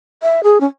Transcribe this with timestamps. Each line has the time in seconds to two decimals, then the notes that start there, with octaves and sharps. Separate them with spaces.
0.22 E5
0.43 G#4
0.60 C#4